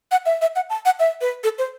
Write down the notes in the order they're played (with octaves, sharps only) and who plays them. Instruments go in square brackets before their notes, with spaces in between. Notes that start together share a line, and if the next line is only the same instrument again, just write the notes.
[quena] F#5
E5
E5
F#5
A5
F#5
E5
B4
A4
C5